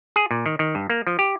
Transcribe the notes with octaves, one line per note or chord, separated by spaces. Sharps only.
G#4
A#2
D#3
D#3
G2
A#3
F3
G4